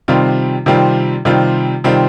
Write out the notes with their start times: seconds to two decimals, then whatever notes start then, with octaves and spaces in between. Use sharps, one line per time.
0.08 C3 D#3 G3 C4 F4
0.66 C3 D#3 G3 C4 F4
1.25 C3 D#3 G3 C4 F4
1.84 C3 D#3 G3 C4 F4